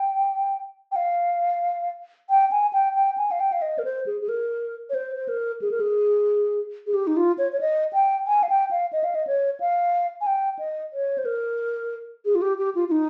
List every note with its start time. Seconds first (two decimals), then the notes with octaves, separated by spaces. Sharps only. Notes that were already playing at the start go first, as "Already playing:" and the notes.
Already playing: G5
0.92 G5
0.96 F5
2.30 G5
2.51 G#5
2.73 G5
2.95 G5
3.18 G#5
3.31 F5
3.40 G5
3.52 F5
3.62 D#5
3.79 A#4
3.85 C5
4.06 G#4
4.21 G#4
4.29 A#4
4.90 C#5
4.94 C5
5.16 C5
5.28 A#4
5.62 G#4
5.71 A#4
5.80 G#4
6.87 G#4
6.94 G4
7.07 D#4
7.17 F4
7.38 C#5
7.52 C#5
7.61 D#5
7.93 G5
8.27 G#5
8.43 F5
8.49 G5
8.71 F5
8.93 D#5
9.04 F5
9.15 D#5
9.27 C#5
9.60 F5
10.21 G#5
10.27 G5
10.59 D#5
10.93 C#5
11.18 C5
11.25 A#4
12.25 G#4
12.35 F4
12.42 G4
12.58 G4
12.75 F4
12.88 F4
12.91 D#4